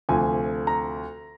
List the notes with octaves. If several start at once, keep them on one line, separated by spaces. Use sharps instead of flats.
D2 C3 F3 G#5
A#5